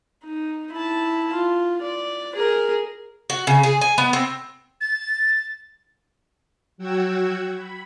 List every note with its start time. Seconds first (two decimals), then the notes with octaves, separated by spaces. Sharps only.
0.24 D#4
0.72 E4 A5
1.34 F4
1.82 D5
2.35 G#4 A#4
3.30 F#4
3.47 C#3
3.63 G#4
3.81 G#5
3.98 B3
4.13 C4
4.81 A6
6.78 F#3 F#4 F#5 G5 E6 G#6
7.55 B5